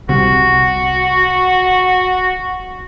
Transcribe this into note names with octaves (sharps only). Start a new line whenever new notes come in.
C2 F#4